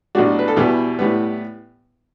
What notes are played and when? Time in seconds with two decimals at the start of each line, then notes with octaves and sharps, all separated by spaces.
0.15 B1 A2 G3 D4 F#4
0.39 B4
0.48 A4
0.56 E2 B2 G3 B3 E4 G4
0.99 A2 E3 G3 B3